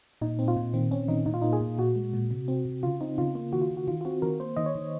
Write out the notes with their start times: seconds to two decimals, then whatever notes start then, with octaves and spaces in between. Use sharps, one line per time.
0.21 A#2 D#4
0.39 C4
0.48 F4
0.56 A#2
0.74 D#3 C4
0.91 C4 C#4
1.08 D#3 D#4
1.26 A#2 D#4
1.34 F4
1.42 A#3 D#4
1.53 G#4
1.61 A#2
1.79 A#2 F#4
1.95 G#3
2.14 A#2
2.31 C3
2.48 C4
2.65 C3
2.83 C#3 F4
3.01 C4 D#4
3.18 C#3 F4
3.35 A#3 F4
3.53 D#3 F#4
3.61 F4
3.71 D#3
3.77 F#4
3.88 D#3 F4
4.01 F4
4.05 C4 F#4
4.22 D#3 A#4
4.40 A#3 C5
4.56 D#3 D#5
4.66 C#5
4.75 D#3